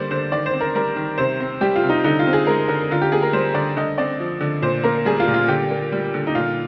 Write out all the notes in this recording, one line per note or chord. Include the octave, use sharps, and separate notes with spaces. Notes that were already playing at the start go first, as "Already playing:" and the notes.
Already playing: D3 G3 A#3 C5 D5
D3 C5
D#3 D5
C5
C4
A#4
G3 A#4
D#3
C3 C5
C4
G3 G4
F4
C3
D#4
D3 D#4
F4
C4
G#4
G#3 A#4
D3 A#4
D3 F4
G4
A#3 G#4
A#4
G3 C5
D3 D5
D3 D#5
C4 D5
F3
D3
A#2 C5
A#3 A#4
G3 G#4
F4
A#2
F4
D3 G4
A#3
G3
D3
D#4
A#2 F4